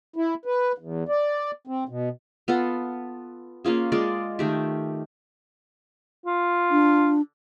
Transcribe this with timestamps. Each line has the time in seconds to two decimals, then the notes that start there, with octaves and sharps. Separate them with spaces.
0.16 E4
0.45 B4
0.78 E2
1.09 D5
1.67 C4
1.89 B2
2.48 B3 F4 A4 F#5
3.65 A#3 C#4 F4 G#4
3.92 G#3 F4 D5
4.39 D#3 A3 G4
6.26 F4
6.71 D4